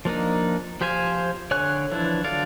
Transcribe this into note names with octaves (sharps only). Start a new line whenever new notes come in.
F3 A#3 D4 D#4
F3 G4 C5 F5 G#5
D3 C#5 G#5 C#6 F#6
E3 F3 D4 E4
D3 F#3 A4 D5 F5